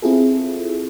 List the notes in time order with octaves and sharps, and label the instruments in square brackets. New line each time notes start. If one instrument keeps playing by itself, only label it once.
[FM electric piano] C4 E4 F4 G#4 A4